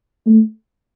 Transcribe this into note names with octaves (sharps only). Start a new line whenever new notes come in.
A3